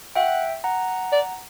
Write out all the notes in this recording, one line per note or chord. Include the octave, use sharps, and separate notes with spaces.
E5 F#5 G5
F#5 A#5
D5